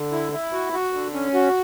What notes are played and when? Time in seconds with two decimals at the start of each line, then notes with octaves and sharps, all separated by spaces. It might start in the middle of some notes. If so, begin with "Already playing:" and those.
Already playing: D3
0.12 E4
0.32 E4
0.53 F#4
0.73 F#4
0.93 D3
1.14 C#4
1.34 F#4